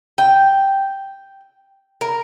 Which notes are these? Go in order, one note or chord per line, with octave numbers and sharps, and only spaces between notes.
G5
A#4